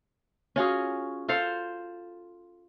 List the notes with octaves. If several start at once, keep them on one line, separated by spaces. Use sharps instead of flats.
C#4 F4 F#4 G#4
F4 A4 C5 F5